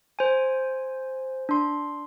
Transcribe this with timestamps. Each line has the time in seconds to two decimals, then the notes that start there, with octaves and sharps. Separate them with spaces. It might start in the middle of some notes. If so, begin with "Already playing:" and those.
0.19 C5 G#5
1.49 D4 C6